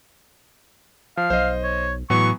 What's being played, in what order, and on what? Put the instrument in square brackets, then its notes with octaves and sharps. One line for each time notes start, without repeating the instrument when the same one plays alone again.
[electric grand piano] F3 [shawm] F5
[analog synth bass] B1 [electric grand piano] C5 D#5
[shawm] C#5
[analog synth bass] A2 [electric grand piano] E3 F#3 B3 [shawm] C#6